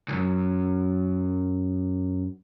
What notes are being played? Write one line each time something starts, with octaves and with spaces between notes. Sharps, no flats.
C2 F#2